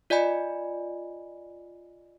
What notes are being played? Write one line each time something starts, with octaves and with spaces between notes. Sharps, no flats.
F4 D5 D#5 G#5 B5